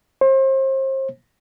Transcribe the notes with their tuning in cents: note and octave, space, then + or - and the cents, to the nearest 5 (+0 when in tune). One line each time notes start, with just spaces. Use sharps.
C5 +35